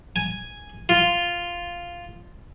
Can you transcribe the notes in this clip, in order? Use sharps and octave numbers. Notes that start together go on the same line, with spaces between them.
G#5
F4